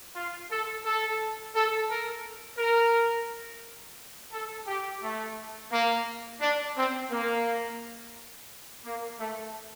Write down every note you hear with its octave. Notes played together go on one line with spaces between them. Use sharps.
F4
A4
A4
A4
A#4
A#4
A4
G4
A3
A#3
D4
C4
A#3
A#3
A3